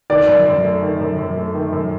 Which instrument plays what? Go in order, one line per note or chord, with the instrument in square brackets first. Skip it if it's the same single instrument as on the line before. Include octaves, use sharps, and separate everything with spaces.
[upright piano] D#3 [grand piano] D5
[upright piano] F#2
F#2
A3
D#3
F#2
F#2
A3
D#3
F#2